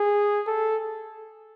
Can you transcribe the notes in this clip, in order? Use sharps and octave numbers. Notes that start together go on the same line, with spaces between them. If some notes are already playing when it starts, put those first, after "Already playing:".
Already playing: G#4
A4